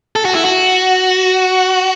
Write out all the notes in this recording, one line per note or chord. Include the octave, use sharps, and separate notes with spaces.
A4
F#4
E4
F#4